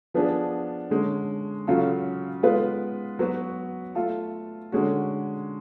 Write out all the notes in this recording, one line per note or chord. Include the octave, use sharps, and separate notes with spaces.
F3 B3 D4 G#4
D3 G#3 C#4
C#3 F#3 C#4 F4 A4
G#3 B3 F4 B4
F#3 B3 F#4 B4
A3 F4 A4
D3 G#3 C#4 F#4